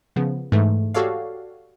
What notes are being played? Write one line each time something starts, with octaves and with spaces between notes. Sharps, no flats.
C#3 F3 B3
G#2 E3 A3
F#4 G4 A4 C#5 D5 F5